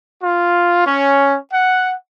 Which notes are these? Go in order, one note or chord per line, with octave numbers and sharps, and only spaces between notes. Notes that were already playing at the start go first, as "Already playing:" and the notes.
F4
C#4
F#5